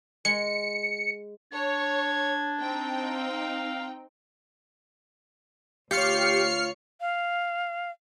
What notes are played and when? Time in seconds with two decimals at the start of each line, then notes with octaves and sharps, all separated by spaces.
0.25 G#3 C#7
1.53 D4 C#5 G#6
2.62 C4 D#4 G5
3.03 F5
5.91 D2 F4 G4 C#5 F6 C7 C#7
7.01 F5